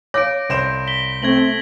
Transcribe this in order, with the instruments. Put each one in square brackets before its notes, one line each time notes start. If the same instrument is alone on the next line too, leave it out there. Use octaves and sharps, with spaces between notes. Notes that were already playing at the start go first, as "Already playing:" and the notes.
[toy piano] C#5 F5 [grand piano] D6 [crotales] A#6 D7
[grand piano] C2 C5 E7
[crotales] B6 G7
[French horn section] A3 C4 [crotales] G#6 A#6 F#7